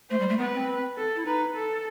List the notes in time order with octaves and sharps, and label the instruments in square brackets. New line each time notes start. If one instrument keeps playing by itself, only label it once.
[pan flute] A3 [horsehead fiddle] C5
[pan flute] G3
A3
[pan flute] B3 [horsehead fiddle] B4
[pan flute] C4
[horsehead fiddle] A4
[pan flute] E4
[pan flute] D#4 [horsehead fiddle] B4
[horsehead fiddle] A4